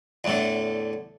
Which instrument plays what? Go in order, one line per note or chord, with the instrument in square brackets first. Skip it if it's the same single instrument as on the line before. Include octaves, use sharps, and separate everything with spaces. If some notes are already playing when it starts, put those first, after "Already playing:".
[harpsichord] E2 A2 D3